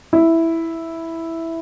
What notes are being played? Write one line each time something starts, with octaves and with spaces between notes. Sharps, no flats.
E4